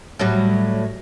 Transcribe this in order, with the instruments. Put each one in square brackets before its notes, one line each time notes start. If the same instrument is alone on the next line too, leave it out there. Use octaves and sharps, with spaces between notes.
[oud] A2 F#3 G3